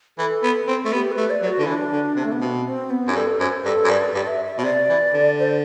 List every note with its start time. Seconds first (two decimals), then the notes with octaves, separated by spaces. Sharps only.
0.18 E3 A4
0.43 B3
0.68 C4
0.85 A3
0.93 B3 G4
1.12 B4
1.17 A3
1.30 D5
1.42 F#3
1.48 F#4
1.59 D3
1.63 E4
1.67 E3 D4
1.92 D3
2.16 C3
2.24 A3
2.32 B3
2.41 B2 C4
2.66 C4
2.90 B3
3.08 F#2
3.11 G4
3.16 G2 A4
3.40 F#2 C5
3.65 G2 A4
3.85 F#2
3.90 G2 D5
4.09 D5
4.15 G2
4.21 D5
4.27 E5
4.45 E5
4.58 B2 C5
4.64 C3 D5
4.89 E3
5.14 D3
5.39 C5